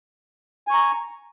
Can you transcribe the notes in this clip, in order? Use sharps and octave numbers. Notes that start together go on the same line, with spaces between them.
G#5 A#5 C#6